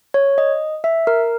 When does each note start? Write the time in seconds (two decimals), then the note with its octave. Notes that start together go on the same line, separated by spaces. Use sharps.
0.14 C#5
0.38 D#5
0.84 E5
1.07 A#4